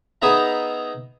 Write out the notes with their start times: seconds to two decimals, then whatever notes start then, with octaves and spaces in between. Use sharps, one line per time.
0.22 B3 D#4 G#4 D#5 E5 A#5